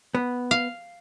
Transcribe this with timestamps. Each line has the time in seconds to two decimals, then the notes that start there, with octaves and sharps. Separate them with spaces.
0.15 B3
0.51 F5